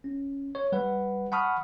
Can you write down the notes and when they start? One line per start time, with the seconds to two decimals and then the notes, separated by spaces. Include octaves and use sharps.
0.04 C#4
0.55 C#5
0.72 G3 B4 F#5
1.32 F#5 A5 B5 C#6 D#6 F6